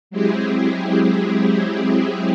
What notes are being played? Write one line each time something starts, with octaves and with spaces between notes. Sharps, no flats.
F#3 G#3 C4 E4 G4 G#4